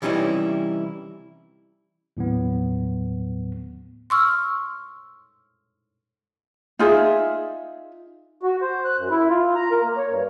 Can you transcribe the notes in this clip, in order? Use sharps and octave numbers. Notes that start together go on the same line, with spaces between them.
C3 E3 G3 C#4 D#4 E4
D#2 A2 F#3 B3
C6 C#6 E6 F6
D#4 F4 G#4 E5
F#4
C5
F#6
F#2
E4
F4
A#5
A#4
A#3
C#5
G2